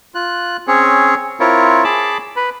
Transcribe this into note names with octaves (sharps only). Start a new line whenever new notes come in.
F4 F#6
C4 C#4 G#4 C#5
C4 E4 F4 A#4 C#5
G#4 A5 B5 D6
B4 B5